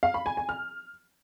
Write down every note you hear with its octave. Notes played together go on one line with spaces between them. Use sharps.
F5
B5
G#5
G#5
F6